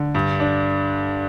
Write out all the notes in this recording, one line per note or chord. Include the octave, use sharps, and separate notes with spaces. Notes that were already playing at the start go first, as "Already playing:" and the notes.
Already playing: D3
G2
D4